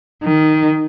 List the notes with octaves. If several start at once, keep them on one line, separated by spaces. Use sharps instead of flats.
D#3